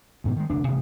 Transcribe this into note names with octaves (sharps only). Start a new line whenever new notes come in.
D2 G#2 B2 D#3
D#3 G#3
F1 D2 D4
A1 G2 C3